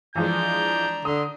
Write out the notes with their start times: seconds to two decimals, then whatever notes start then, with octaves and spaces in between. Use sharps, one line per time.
0.16 E3 F3 G#3 D4 A#5 G6
1.05 D3 C6 D#6